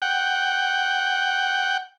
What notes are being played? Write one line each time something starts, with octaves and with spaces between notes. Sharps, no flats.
F#5 G5